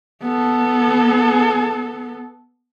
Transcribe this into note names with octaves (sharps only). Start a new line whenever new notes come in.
B3 A4